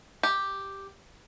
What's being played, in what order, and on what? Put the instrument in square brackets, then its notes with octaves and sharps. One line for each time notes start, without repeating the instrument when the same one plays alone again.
[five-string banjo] G4